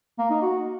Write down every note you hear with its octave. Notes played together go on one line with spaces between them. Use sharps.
A#3
D#4
F#4